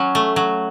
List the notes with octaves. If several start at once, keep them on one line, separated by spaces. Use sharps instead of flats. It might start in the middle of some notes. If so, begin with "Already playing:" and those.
Already playing: F#3 C#4
A3
F#3